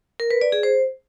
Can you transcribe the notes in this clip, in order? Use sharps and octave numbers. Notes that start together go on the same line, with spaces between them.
A#4
B4
D5
G#4
C5